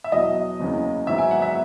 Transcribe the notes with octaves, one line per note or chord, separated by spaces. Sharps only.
E5
E2 B2 F#3 B3 D#5
F#1 E2 C#3
G#1 G#2 F#3 B3 E5
G#5
F#5
E5